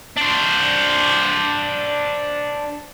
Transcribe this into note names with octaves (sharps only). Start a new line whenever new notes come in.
D4 C5